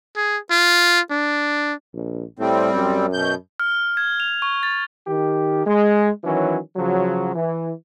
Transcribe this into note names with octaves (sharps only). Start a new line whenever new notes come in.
G#4
F4
D4
A#1
A2 G3 C4
F#2
B2 G6
F6
G#6
F7
C#6
A6
D#3 G4
G#3
D#3 E3 F#3 C#4
C#3 F3 F#3
E3